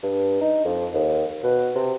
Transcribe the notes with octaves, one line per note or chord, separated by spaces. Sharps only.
G2
D#4
F2
D#2
B2
C3